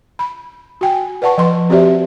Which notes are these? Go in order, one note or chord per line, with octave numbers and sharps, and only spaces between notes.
B5
F#4 G5 G#5
B4 D5 F#5 A5 C#6
F3 B4 C6
C4 F#4 G4 C5 D5 E5